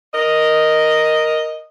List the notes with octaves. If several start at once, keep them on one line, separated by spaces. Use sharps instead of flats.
A#4 D#5